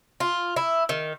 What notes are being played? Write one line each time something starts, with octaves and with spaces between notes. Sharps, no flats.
F4
E4
D#3